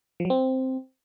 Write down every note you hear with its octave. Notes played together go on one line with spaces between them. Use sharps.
F3
F#3
C4